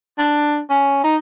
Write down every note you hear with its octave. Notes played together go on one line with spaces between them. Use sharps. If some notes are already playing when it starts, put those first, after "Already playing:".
D4
C#4
D#4